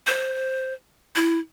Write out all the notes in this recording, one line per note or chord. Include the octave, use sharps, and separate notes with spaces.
C5
E4